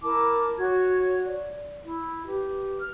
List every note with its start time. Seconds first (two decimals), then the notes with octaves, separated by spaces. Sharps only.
0.02 E4 A#4 A5 D6
0.58 F#4 C#5 C#6 G#6
1.24 D5
1.82 E4
2.26 G4 B4
2.80 F6